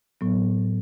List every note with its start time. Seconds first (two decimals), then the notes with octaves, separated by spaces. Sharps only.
0.21 A2 F#3 B3